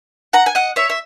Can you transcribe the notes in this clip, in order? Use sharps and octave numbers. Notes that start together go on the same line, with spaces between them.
F#5 A#5
G#5
D#5 F#5
C#5 E5
E5